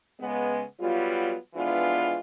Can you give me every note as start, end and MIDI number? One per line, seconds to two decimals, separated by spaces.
0.21 0.63 49
0.21 0.63 56
0.21 0.63 59
0.80 1.35 54
0.80 1.35 55
0.80 1.35 59
0.80 1.35 65
1.55 2.19 41
1.55 2.19 52
1.55 2.19 56
1.55 2.19 59
1.55 2.19 62
1.55 2.19 65